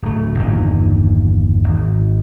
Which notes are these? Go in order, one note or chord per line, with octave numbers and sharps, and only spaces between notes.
D1 A3
G1 E2 A#2 D#3
G#1